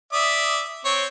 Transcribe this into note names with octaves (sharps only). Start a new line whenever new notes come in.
D5 E5 D#6
C4 C#5